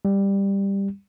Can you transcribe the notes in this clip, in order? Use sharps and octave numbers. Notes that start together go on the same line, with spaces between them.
G3